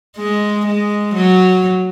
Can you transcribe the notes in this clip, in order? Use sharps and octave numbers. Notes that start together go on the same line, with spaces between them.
G#3
G#3
F#3